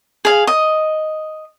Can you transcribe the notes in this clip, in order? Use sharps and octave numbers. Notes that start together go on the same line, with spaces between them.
G#4 F5
D#5